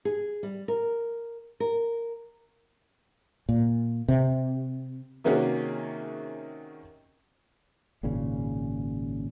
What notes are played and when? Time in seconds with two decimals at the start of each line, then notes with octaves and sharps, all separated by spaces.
0.05 G#4
0.43 G3
0.68 A#4
1.60 A#4
3.49 A#2
4.08 C3
5.24 C3 D#3 A#3 C#4 F#4 G#4
8.03 G#1 A#2 C#3 C#4